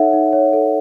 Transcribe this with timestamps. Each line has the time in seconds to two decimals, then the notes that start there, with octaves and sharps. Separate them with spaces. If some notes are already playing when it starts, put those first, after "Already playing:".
Already playing: D#4 A4 C#5 E5 F#5
0.13 D#4
0.33 C#5
0.53 A4